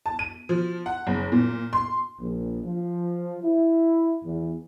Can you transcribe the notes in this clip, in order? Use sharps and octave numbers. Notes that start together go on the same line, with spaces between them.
A5
D#7
F3
F#5
F#1
A#2
C6
A#1
F3
E4
E2